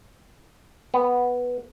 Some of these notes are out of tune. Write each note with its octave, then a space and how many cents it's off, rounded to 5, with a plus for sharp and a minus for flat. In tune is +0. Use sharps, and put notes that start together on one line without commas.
B3 -5